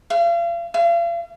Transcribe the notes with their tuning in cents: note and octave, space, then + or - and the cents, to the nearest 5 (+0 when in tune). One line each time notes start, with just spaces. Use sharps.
F5 -40
F5 -40